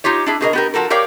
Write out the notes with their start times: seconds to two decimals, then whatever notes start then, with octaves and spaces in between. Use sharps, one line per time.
0.04 D#4 F4 G4 C#5
0.26 D4 E4 G#4
0.41 B2 G#4 A#4 D#5
0.53 B3 G4 A#4
0.74 F3 F#4 A4 A#4
0.90 G4 A#4 C#5 D5 F5 G5